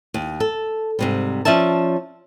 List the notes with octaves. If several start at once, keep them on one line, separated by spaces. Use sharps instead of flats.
D#2
A4
G#2 C3 G3
F3 C#4 D5 E5 A5